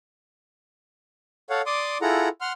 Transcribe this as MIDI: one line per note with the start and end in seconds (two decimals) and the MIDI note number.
1.50 1.62 69
1.50 1.62 73
1.50 1.62 77
1.50 1.62 78
1.66 1.98 74
1.66 1.98 84
1.66 1.98 86
1.66 1.98 87
2.02 2.29 64
2.02 2.29 65
2.02 2.29 68
2.02 2.29 69
2.02 2.29 78
2.02 2.29 82
2.41 2.53 78
2.41 2.53 84
2.41 2.53 89